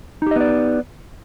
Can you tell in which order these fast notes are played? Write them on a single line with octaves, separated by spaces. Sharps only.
D#4 G4 D#5 B3 D5